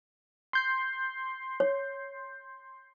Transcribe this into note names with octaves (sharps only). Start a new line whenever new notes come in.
C6 G6 C7
C#5